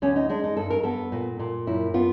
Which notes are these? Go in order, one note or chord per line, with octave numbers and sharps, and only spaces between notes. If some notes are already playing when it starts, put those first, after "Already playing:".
D2 C#4
D#4
G#3 D4
D#4
G2 A4
A#4
B3 A4
A#2
A#2
F#2 E4
B3 F4